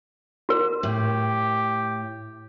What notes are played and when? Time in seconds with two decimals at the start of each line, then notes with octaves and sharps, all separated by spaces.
0.49 F#4 A#4
0.83 A2 G4